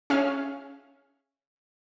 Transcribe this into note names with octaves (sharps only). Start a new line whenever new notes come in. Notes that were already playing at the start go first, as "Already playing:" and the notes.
C#4 G#4 E5 F5 F6